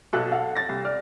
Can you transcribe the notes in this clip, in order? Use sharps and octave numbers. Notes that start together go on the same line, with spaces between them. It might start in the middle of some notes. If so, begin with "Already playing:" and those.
B1 B2 A4 F#6
A4 F5 F#5
A6 A#6
C2
D5 F6